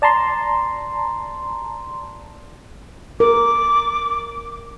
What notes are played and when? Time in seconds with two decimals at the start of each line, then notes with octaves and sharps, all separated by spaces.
0.02 D5 A5 A#5 C6
3.20 A#4 D6